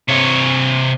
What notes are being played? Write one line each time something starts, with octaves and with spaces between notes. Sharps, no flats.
C3 C#5